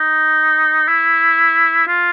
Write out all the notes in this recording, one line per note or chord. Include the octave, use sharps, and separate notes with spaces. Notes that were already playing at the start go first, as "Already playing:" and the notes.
Already playing: D#4
E4
F4